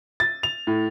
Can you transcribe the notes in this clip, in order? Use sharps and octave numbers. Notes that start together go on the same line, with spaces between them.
A6
F7
A2